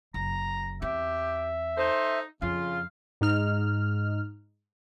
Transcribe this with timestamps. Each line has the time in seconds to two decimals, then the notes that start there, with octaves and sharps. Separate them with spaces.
0.14 F#1 A#5
0.82 E2 C4 G4 E5
1.78 D#4 A4 C5
2.42 F2 C#3 F4 F5
3.21 G#2 D#4 F6